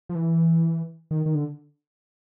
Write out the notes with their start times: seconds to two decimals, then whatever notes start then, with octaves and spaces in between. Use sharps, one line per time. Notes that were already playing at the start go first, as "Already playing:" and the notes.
0.09 F3
0.15 E3
1.11 D#3
1.26 D#3
1.35 D3